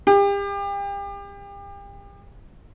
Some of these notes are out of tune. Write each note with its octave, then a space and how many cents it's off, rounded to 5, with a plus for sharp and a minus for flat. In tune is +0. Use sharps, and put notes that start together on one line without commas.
G4 +35